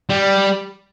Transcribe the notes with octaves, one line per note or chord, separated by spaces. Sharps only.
G3